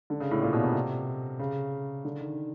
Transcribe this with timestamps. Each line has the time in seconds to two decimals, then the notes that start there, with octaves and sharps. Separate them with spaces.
0.10 D3
0.20 C#3
0.31 A2
0.42 A#2
0.53 B2
0.64 C3
1.39 C#3
2.05 D3
2.20 D#3